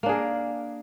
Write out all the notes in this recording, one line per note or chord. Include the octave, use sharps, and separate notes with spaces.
A#3 D4 G#4 A#4